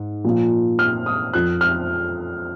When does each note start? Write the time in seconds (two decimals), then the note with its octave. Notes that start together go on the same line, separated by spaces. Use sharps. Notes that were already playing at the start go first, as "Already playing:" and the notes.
Already playing: G#2
0.25 A#2 F3
0.79 F6
1.06 D#6
1.33 F2 F3 F#6
1.61 F6